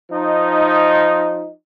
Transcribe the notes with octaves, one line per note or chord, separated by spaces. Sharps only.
F3 D#4